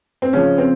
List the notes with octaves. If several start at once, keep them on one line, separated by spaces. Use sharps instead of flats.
C4
C#3 F3 C#4
C4